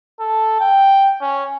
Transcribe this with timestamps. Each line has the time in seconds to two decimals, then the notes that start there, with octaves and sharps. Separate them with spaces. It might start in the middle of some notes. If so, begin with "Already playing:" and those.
0.20 A4
0.60 G5
1.21 C#4